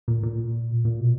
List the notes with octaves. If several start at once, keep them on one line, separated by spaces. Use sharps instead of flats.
A#2
A#2
A#2
B2